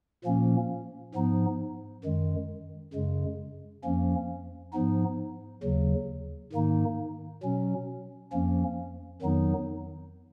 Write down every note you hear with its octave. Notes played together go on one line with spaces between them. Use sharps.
A#2 F3 A#3 C#4
G#2 F3 B3 D#4
F#2 D#3 G#3
F#2 C#3 G#3
F2 F3 A#3 C#4
G#2 F3 B3 D#4
D#2 C#3 F#3
G#2 D#3 A#3 D#4
B2 F#3 C#4
F2 F3 A#3 C#4
F2 D#3 F#3 B3 D#4